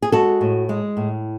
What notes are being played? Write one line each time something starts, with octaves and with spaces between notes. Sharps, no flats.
G#4
G#3 F#4 A4
A2
G#3
A2